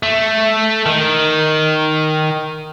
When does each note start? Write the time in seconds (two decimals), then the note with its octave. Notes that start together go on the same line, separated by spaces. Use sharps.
0.03 A3
0.86 D#3